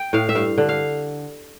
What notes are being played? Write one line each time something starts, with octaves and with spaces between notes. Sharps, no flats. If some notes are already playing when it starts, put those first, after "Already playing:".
Already playing: G5
A2 F5
E5
G2 F5
D3
F5